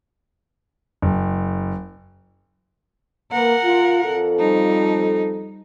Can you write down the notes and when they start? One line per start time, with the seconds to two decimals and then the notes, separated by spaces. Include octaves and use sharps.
1.02 F#1
3.32 A#3 A#4 B4 F#5
3.63 F4
4.04 F2 F3 A4
4.38 G3 D#4